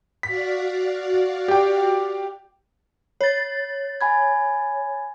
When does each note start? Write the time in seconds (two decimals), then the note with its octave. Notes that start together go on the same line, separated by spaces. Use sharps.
0.23 F#4 D5 F5 B6
1.48 G4 G5
3.21 C#5 A6
4.01 G#5 B5 G#6